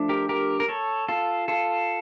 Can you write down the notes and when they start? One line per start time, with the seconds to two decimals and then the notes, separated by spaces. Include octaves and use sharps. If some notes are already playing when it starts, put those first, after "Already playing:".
Already playing: F3 A3 D4
0.09 G4 A#4
0.29 G4 A#4
0.60 A#4
0.69 A4 C#5
1.08 F4 A4
1.48 F4 A4